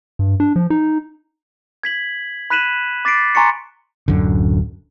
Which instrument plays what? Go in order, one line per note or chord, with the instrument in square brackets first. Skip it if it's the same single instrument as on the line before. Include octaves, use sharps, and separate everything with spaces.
[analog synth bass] G2
D4
F3
D#4
[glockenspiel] G#6 B6 F#7
B5 F#6 B6 D#7 E7 F#7
D6 A6 B6 C7 D7
G#5 A#5 C6 C#6 A6 C#7
[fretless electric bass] D1 F#2 D3